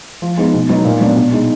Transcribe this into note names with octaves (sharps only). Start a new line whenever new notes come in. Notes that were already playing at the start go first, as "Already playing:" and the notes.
F3
G#3 B3 D#4
B2
F#3 B3 D#4
A#2
F#3 B3 D4
B2
G#3 D#4